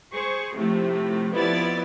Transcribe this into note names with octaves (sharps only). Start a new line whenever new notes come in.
G#4 C5 C#6
A2 C3 F3 A3
F2 F3 B3 E4 D5 A6